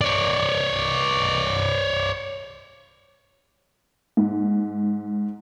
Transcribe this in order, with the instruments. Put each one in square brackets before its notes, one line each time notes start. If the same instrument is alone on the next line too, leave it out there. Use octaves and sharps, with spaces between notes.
[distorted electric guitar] C#5 D5
[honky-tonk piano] G#2